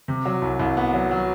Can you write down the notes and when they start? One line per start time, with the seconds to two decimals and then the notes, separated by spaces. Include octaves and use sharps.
0.08 C3
0.25 F#3
0.42 C2
0.60 C2
0.77 B3
0.94 F#3
1.11 F#3